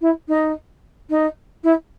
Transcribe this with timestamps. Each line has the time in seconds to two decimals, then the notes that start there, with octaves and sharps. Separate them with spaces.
0.01 E4
0.28 D#4
1.09 D#4
1.63 E4